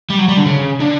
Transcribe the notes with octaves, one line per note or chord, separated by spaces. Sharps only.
G3
F#3
G3
D3
C#3
D3